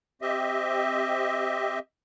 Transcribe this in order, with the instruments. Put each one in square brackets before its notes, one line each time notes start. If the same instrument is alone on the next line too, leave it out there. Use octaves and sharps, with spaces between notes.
[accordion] C4 G4 D#5 E5